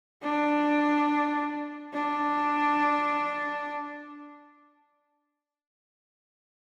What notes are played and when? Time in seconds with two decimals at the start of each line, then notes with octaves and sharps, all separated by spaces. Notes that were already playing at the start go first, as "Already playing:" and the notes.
0.22 D4
1.93 D4